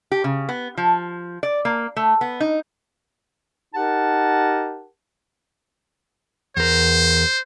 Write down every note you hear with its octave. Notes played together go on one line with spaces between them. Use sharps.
G4
C#3
B3
F3
D5
A#3
A3
B3
D#4
D#4 G4 A#4 F#5 A5
E2 A#4 C5